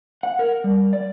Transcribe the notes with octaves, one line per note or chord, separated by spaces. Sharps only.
F#5
A#4
G3
D5